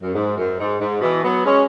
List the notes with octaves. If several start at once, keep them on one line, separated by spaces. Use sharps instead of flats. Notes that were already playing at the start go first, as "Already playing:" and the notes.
F#2
G#2
F#2
G#2
G#2
B2 E3
F#3 B3
G#3 C#4